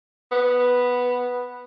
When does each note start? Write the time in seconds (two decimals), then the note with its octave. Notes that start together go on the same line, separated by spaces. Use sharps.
0.32 B3